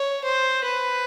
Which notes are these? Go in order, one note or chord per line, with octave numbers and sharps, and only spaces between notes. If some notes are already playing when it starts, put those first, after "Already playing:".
Already playing: C#5
C5
B4